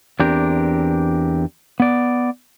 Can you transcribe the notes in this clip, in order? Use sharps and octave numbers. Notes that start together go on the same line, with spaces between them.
E2 C4 D4 G4 A#4
B3 D5